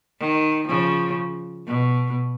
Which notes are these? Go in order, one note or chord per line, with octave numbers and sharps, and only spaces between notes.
D#3
C#3 F3
B2